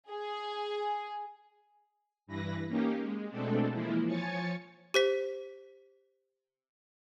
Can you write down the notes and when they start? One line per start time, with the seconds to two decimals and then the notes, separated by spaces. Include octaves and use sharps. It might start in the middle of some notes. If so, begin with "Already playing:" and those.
0.12 G#4
2.27 G2 E3 B4 A#6
2.68 A#3 C#4 D#4 G4
3.00 G#3
3.31 B2 G#3 A3 C4 D4 A4
3.71 E3 F3 G#3 A#3 E4
4.07 F3 C#5 G#5 A6 C#7
4.94 G4 C5 B6